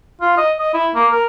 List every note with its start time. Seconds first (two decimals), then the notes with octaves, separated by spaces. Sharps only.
0.22 F4
0.38 D#5
0.59 D#5
0.74 E4
0.95 A#3
1.12 A#4